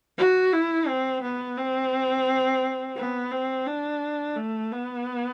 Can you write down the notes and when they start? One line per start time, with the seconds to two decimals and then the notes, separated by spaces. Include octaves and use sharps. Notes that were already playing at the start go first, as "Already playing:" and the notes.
0.18 F#4
0.52 E4
0.87 C4
1.22 B3
1.57 C4
2.97 B3
3.32 C4
3.67 D4
4.36 A3
4.72 B3